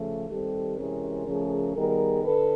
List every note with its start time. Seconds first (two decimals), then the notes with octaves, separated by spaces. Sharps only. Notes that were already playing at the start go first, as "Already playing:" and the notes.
Already playing: C#3 F3 A3
0.28 D#3 G3 C4 G4 A4
0.77 C3 E3 G#3 C#4 G#4 A#4
1.27 C#3 F3 A3 C#4
1.75 D#3 G3 B3 G#4 A#4
2.24 D3 A4 B4